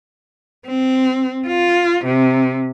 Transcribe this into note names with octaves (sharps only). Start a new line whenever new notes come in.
C4
F4
C3